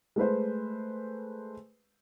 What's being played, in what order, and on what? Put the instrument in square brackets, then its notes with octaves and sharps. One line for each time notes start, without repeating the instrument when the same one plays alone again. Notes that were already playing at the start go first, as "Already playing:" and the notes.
[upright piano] G#3 A3 B4 C5